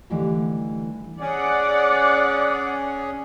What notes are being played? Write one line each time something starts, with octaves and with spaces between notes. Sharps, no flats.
D3 E3 G3 A3 D#4 G4
C#4 G#4 D5 F#5